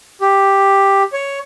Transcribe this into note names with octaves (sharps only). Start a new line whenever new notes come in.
G4
C#5